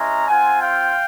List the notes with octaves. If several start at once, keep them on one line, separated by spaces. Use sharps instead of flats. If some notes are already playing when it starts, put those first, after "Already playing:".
Already playing: G#3 C#4 E4 A#5
C4 F4 F#5 G#5
F5 G5